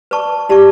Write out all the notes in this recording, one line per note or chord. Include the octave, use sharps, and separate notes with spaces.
B4 D5 A5 C#6
E4 G4 D5 A5 C#6